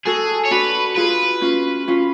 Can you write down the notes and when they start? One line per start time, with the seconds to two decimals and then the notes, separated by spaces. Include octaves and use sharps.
0.06 F#4 G#4 A4
0.45 C#5
0.51 D4 F#4 B4
0.97 F4 G#4 B4
1.41 C#4 F4
1.88 C#4 F4